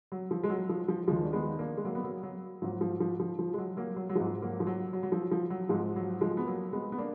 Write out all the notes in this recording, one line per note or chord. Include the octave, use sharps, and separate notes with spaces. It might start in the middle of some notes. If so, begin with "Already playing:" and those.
F#3
F3
G#3
F#3
F3
F3
D#2 D#3 F3 G#3
D4
G#3 B3
D#4
A#3 D4
G#3
F#3 A#3
B3
F#3 A#3
F#3
G#2 F3 F#3
F3
F3
F3
F3
G#3
F#3
F#3 A#3
F#3
F#3
G#2 F3 G#3
F#3 A#3
F3
F#3
F#3
F#3
F3
F3
F#3
G#2 F3 G#3
F#3
F3 G#3
B3
F#3 A#3
G#3 B3
B3
A#3 D4